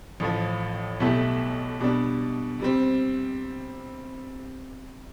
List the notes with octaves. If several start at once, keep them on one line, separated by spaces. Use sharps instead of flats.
A1 A2 F3
B1 B2 A3 E4 G4
B2 G3 D4
C3 G3 C4